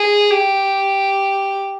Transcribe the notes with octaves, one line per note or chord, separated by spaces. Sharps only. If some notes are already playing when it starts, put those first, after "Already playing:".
Already playing: G#4
G4